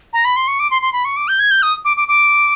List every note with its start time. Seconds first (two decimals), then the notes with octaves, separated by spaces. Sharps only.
0.13 A#5
0.25 B5
0.36 C6
0.48 C#6
0.60 D6
0.71 C6
0.82 C6
0.93 B5
1.05 C#6
1.17 D6
1.28 G6
1.40 G#6
1.51 G6
1.63 D#6
1.85 D6
1.97 D6
2.08 D6